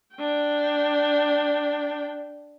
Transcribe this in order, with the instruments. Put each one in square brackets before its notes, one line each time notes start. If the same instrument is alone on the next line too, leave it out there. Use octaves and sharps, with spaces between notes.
[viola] D4 G5